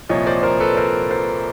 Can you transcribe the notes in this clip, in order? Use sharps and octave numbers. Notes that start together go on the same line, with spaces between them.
C2 A#2 F3 C#5 D#5
C5 D5
A#4 C5
A4 B4
A#4 C5
A#4 C5